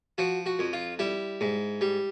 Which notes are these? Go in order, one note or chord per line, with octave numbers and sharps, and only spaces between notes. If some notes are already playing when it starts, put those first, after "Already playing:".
F3 F#4
F#4
F2
F4
G3 E4
G#2
G3